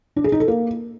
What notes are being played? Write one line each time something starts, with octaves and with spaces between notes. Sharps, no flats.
D4
G#4
D#4
A4
A#3